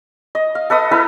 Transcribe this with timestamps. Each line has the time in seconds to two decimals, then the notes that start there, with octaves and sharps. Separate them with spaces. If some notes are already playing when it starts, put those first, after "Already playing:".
0.35 D#5
0.55 F5
0.70 A4 B4 D#5 D#6
0.91 E4 A4 B4 B5